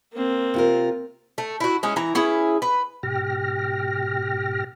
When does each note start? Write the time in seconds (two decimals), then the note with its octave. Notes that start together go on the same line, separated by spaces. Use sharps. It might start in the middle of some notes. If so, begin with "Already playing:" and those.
0.13 A#3 C4
0.54 C3 F4 A#4
1.38 A3
1.60 E4 F#4
1.83 G#3 C#4 E4
1.96 E3 E4 A#5
2.15 C#4 E4 G#4 B4
2.62 B4
3.03 G#2 B2 G4 G5 F6 A#6